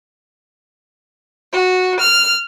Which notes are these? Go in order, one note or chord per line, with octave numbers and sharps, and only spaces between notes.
F#4
F6